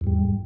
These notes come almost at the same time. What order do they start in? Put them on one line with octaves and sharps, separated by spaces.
E2 G#2 G3